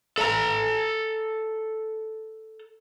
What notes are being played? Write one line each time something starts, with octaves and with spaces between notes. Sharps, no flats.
A4 A#5